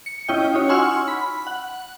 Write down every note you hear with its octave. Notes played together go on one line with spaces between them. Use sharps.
C#7
C#4 E4 F4 D#5 G5
D#4 F#4 C#5
F#5 G#5 C6 C#6 E6 F6
B5
F#5